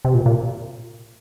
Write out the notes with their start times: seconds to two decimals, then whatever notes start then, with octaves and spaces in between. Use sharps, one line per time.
0.05 C3
0.14 A#2
0.26 A#2